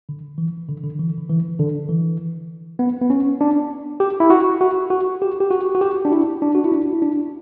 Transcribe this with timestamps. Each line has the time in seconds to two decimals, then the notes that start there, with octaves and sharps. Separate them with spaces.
0.09 D3
0.38 E3
0.69 D3
0.84 D3
0.99 E3
1.17 D3
1.30 E3
1.59 D3
1.89 E3
2.79 B3
3.01 B3
3.10 C#4
3.41 D4
4.00 G4
4.20 E4
4.30 F#4
4.61 F#4
4.90 F#4
5.22 G4
5.40 G4
5.51 F#4
5.75 F#4
5.81 G4
6.05 D4
6.12 E4
6.42 D4
6.55 F#4
6.64 E4
6.72 D4
6.93 E4
7.02 D4